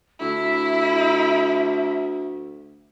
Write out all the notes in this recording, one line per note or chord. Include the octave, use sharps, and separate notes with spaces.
D2 E4 E5